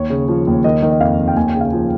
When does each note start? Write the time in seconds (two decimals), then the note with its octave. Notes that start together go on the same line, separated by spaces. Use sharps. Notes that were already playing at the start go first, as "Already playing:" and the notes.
Already playing: D#2 C#5
0.10 C#3
0.29 F3
0.47 D#2
0.64 D#3 D#5
0.82 D#3
0.91 D#5
1.00 F2 F5
1.19 F2
1.28 G5
1.36 D#2 G#5
1.48 G5
1.54 C#3
1.61 F5
1.73 F3